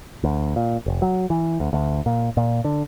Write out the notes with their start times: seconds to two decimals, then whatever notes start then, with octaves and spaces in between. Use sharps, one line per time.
0.24 D2
0.56 A#2
0.86 F1
1.02 F#3
1.30 E3
1.60 D2
1.73 D2
2.06 A#2
2.37 A#2
2.64 D3